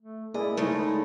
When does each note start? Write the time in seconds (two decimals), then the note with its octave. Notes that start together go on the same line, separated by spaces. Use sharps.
0.01 A3
0.34 A#3 E4 G#4 D5 D#5
0.57 C#3 G#3 A3 D#4 D#5